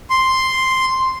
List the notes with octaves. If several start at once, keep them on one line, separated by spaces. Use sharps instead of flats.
C6